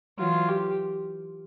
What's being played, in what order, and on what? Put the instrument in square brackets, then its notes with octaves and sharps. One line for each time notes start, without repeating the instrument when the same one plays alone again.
[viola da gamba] E3 F#3 [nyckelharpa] F4
[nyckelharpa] G4